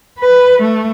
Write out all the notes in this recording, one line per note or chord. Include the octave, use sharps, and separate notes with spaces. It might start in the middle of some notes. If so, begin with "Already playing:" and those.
B4
A3